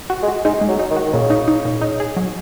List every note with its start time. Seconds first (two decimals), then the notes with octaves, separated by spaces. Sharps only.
0.10 F#4
0.22 G#3
0.28 F#4
0.45 G#3 D#4
0.61 G#3
0.68 F#3
0.79 D#4
0.91 D#3
0.96 F#4
1.06 D#3
1.13 A#2 C#3
1.30 D#4
1.48 D#4
1.65 A#2
1.82 D#4
2.00 G#4
2.17 F#3